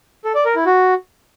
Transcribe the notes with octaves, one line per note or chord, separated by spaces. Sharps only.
A4
D5
A#4
E4
F#4